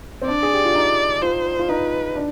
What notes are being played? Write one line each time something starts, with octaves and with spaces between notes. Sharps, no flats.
C4
D4 D5
G#4
G4
F4
D#4
F4 C5
F4
D#4 B4
D4